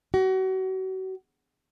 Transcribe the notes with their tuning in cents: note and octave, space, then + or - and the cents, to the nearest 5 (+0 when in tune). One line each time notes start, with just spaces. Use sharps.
F#4 +35